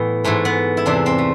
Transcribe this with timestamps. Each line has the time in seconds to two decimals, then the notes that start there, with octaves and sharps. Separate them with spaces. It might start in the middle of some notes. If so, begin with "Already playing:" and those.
Already playing: A2 E3 B3
0.24 G#2 E3 A3
0.45 B3
0.77 E4
0.86 E2 C3 E3 D4
1.06 C4
1.18 A3